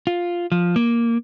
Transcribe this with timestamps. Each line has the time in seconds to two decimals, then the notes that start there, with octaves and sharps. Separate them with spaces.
0.07 F4
0.52 F3
0.76 A#3